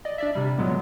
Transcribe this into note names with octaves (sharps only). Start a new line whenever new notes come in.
D5 D#5
D4 D5 E5
C3 G3
A#2 D3 F#3 G#3 B3